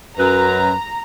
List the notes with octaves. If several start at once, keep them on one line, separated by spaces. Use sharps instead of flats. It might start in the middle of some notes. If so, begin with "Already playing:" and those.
F#2 B4 A#5